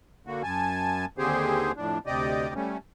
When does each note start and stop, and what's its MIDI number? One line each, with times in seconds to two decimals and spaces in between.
0.27 0.42 50
0.27 0.42 58
0.27 0.42 66
0.43 1.05 42
0.43 1.05 80
0.43 1.05 81
1.18 1.72 39
1.18 1.72 50
1.18 1.72 60
1.18 1.72 67
1.18 1.72 68
1.18 1.72 72
1.77 1.98 41
1.77 1.98 45
1.77 1.98 62
2.06 2.54 38
2.06 2.54 48
2.06 2.54 67
2.06 2.54 74
2.06 2.54 75
2.55 2.77 55
2.55 2.77 57
2.55 2.77 61